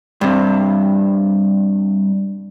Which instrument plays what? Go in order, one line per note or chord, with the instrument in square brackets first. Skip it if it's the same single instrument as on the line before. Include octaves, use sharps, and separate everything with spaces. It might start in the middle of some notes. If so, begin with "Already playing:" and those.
[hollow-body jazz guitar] G2 C3